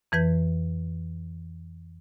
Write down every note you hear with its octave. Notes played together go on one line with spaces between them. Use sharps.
F2 E3 B4 G6